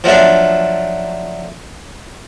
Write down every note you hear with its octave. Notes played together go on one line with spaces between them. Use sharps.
F3 F#3 A3 D4